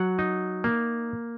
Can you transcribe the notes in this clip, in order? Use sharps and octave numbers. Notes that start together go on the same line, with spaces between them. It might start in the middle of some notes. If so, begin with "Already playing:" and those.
Already playing: F#3 F#5
D#4
A#3